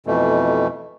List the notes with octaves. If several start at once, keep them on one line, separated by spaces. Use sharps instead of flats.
F2 B2 E3 A3